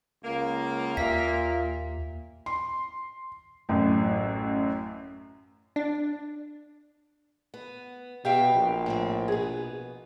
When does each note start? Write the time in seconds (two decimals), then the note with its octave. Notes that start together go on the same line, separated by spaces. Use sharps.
0.24 C#2 A#3
0.97 D#2 A#2 E5 F5 B6
2.46 C6
3.69 A1 F#2
5.76 D4
7.54 B3
8.25 B2 G4 E5 F5 G5
8.55 A#1
8.86 A2 F3 C4
9.28 B2 B3 G#4